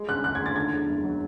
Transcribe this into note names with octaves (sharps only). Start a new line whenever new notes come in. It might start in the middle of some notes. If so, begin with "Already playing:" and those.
Already playing: G#3
C#3 F#6
D2 F#6
G#6
D2
A6
D3 G#6
E2
F#1
F#3